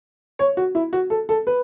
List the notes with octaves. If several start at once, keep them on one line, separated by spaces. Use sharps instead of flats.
C#5
F#4
E4
F#4
A4
A4
B4